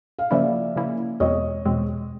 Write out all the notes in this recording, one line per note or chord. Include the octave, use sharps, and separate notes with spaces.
F5
C#3 F3 A#3 C#4 E4 D5 E5
C#3 F3 A#3 C#4 E4
E2 B2 G#3 C4 C#5 D#5
E2 B2 G#3 C4